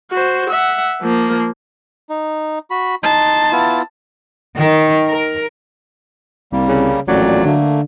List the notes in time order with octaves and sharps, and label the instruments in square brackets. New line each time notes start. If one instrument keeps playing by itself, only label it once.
[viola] F#4 C5
E5 F#5
F3 A#3
[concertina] D#4
F#4 B5
[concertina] D#4 C6 [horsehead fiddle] A5
[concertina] B3 E4 F4
[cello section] D#3
A#4
[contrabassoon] C2 [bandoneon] G3 A#3
[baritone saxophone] C#3
[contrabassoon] A1 [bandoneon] F2 A#2 D5 [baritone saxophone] F#3
[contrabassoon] D3 [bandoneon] A3 A#3